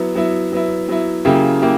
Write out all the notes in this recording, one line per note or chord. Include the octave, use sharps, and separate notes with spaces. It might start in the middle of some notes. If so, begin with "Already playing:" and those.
Already playing: F#3 B3 E4
F#3 B3 E4
F#3 B3 E4
F#3 B3 E4
C#3 F#3 A#3 E4 G4
A#3 E4 G4